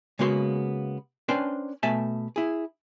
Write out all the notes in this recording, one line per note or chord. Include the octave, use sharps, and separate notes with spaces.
C#3 G#3 A#3 B3 F#4 C6
C#4 D4 B4 C5 G5 A5
B2 A3 E5 G#5 A5
E4 G#4